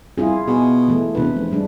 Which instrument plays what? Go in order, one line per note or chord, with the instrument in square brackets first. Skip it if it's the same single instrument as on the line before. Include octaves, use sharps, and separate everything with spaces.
[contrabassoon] C2 [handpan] E4 F4 G#4
[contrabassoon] B2 [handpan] G#4
[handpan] E3 A3
[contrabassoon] E1 [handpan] C3 B4
[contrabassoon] F1
[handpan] G3 G#3 D4